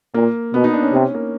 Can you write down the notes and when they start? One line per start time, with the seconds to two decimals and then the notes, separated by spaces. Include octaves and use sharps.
0.14 A#2 A#3
0.54 B2 B3
0.64 D#4
0.73 D4
0.83 C#4
0.93 C3
1.14 A#3